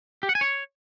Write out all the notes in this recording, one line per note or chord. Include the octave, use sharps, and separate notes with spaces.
G4
F#5
G#5
C#5